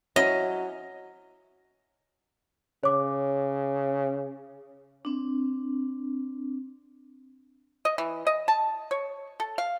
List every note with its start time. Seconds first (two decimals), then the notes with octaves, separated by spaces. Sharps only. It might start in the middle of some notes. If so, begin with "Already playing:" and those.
0.16 F#3 C#4 E4 D#5
2.83 C#3 C#5 D6
5.05 C4 D4
7.85 D#5
7.98 E3
8.27 D#5
8.48 A5
8.91 C#5
9.40 A4
9.58 F5